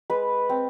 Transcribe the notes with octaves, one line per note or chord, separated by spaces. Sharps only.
G#3 B4
C4